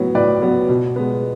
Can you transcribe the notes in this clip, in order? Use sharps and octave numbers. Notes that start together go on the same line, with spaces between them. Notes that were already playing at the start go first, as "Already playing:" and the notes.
Already playing: A2 F#3 B3
A2 B4 D5
F#3 B3
B2
G#3 B3